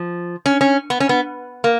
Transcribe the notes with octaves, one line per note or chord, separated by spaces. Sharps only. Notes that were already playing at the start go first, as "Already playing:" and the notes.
Already playing: F3
C#4
C#4
B3
C#4
B3
A#3